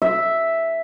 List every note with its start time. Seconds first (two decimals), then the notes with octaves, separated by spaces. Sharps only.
0.02 E5